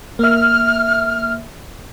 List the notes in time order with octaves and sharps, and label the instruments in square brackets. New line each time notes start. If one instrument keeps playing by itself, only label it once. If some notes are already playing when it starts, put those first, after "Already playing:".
[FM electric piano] A#3 E5 [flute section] F6